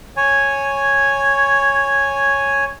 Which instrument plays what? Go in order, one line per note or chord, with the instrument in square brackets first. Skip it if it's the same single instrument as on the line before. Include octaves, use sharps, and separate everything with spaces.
[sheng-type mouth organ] C#5 G#5